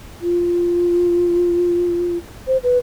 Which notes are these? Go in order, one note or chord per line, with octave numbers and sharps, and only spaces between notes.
F4
C5
B4